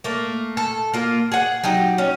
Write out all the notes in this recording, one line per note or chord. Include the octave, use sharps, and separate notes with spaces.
A3 A#3
A4
A#3 F4
G#4 F#5
F#3 D#4 G4
C#4